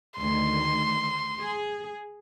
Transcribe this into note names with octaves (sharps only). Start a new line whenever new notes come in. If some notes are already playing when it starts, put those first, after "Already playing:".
D2 D#3 C6
G#4